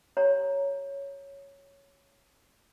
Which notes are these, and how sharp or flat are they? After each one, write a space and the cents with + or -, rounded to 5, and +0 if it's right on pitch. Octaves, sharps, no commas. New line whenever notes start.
G4 -15 C#5 +0 A#5 +0